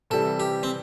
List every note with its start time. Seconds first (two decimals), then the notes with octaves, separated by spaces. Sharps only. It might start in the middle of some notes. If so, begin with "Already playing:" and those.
0.10 C3 E3 G3 A4
0.40 G4
0.63 C4